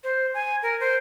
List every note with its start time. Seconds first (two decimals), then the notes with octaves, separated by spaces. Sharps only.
0.04 C5
0.34 G#5
0.63 A#4
0.80 C5